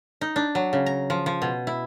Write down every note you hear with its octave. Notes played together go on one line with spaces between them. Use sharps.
D#4
D4
F#3
C#3
A#5
F3
F3
B2
E4